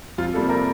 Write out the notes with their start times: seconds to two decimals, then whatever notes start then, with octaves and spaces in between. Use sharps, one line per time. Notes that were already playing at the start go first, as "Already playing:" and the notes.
0.18 F2 F4
0.33 C3 G3 A#3 A4
0.49 A#4